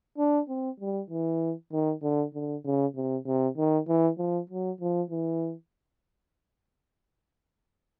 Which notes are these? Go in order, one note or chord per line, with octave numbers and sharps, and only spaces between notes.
D4
C4
G3
E3
D#3
D3
D3
C#3
C3
C3
D#3
E3
F3
F#3
F3
E3